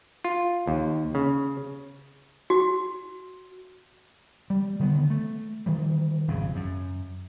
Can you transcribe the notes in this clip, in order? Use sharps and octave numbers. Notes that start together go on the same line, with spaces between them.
F4
D#2
C#3
F#4
G3
D3 D#3 G#3 B3
A3
D#3 E3 G3
G#1 F2 C#3
F#2